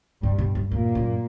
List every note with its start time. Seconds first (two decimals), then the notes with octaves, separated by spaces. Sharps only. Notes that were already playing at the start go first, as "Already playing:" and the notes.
0.22 G2 B2 G3
0.38 B2
0.55 F#2
0.71 E2 A#2 A#3
0.95 F#2